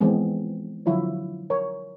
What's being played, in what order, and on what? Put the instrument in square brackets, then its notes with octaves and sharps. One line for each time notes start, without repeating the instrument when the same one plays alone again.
[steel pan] E3 F3 G#3 B3 C4
D3 F3 F#3 E4 F4 C#5
A#4 C#5